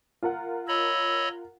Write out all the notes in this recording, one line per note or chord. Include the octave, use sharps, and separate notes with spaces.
F4 A#4 F#5
C#5 D#5 B5 E6